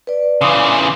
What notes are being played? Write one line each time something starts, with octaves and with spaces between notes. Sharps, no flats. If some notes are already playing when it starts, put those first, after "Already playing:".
B4 D5
C#3 E3 C6 D6 D#6